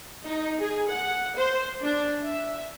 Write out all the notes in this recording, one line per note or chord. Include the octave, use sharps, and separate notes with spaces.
D#4
G#4
F#5
C5
D4
E5